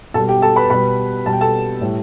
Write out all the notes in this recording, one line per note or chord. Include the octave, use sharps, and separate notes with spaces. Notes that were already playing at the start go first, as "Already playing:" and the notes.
B2 G3 A4 A5
G4 G5
A4 A5
B4 B5
B2 G3 B4 B5
B2 G3 A5
G5
A4 A5
A2 G3